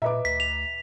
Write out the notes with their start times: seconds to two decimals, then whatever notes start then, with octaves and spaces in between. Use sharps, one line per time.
0.02 A#2 B4 D#5 E5 A#5 D6
0.25 D2 B6
0.40 F7